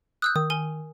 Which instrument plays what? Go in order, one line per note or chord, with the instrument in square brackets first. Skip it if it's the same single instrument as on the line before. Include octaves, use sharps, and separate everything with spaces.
[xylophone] D#6 E6 G6 [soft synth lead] F#6
[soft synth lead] D#3 [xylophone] D#6
[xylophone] A#4 G#5 D#7